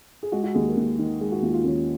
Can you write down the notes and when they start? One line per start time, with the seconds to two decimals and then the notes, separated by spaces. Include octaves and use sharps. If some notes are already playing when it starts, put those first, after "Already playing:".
0.23 G#4
0.32 G#3 F#4
0.44 F#4
0.54 D#2 G#4
0.66 A#4
0.77 D#2
0.99 D#3
1.21 G#3 G#4
1.32 F#4
1.43 D#2 F4
1.54 F4
1.65 D#2 C#4